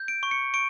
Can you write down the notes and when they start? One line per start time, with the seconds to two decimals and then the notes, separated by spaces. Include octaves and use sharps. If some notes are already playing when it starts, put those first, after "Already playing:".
Already playing: G6
0.08 D7
0.23 C#6
0.31 C#7
0.54 C#6 D7